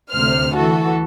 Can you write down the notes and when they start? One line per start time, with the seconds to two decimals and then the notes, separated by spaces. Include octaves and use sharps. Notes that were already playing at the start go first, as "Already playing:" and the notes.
0.12 D2 C3 C5 F6
0.54 E3 F#4 A4